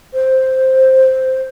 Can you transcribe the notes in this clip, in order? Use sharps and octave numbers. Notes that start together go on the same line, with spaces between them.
C5